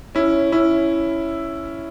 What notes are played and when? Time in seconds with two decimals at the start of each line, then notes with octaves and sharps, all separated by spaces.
0.15 C#4 E4
0.52 C#4 E4